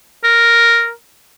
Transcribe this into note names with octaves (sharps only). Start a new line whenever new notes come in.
A#4